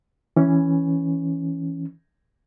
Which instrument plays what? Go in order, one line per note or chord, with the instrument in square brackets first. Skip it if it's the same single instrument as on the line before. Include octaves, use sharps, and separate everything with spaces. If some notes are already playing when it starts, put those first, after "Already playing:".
[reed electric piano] E3 C#4